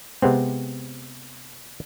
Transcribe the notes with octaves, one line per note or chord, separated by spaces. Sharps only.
C3 G#3 B3 C4